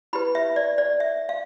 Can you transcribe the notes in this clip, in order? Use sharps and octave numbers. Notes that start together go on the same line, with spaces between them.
E4 G4 B4 B5
E5
D5
D5
E5
F5